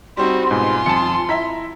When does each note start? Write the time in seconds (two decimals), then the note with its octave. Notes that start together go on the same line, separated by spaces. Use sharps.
0.17 G3 C4 D#4 F#4 C6
0.51 G#2 B2 F4 G#5 C6
0.86 F2 A5 C#7
1.29 E4 E5 A#5 B6